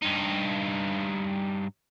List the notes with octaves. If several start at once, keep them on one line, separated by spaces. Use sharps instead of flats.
G2 D#4